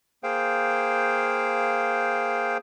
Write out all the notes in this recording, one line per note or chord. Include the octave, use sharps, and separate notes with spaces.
A#3 G#4 C5 F5 G5